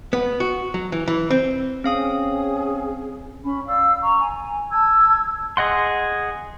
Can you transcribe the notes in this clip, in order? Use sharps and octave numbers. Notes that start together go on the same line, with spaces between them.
B3
F#4
F#3
E3
E3
C4
C4 C#4 G#4 F5 D#6
C#4 B5
D5 F5 E6
A#5 C#6
G#5
A5 E6 G#6
G#4 D#5 F#5 C6